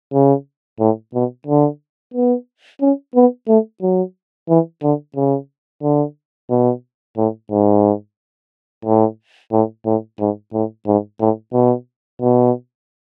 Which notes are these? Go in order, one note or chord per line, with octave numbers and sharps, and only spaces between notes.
C#3
A2
B2
D3
B3
C#4
B3
A3
F#3
E3
D3
C#3
D3
B2
A2
G#2
A2
A2
A2
G#2
A2
G#2
A2
B2
B2